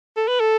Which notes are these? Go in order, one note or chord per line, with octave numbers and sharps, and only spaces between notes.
A4
B4
A4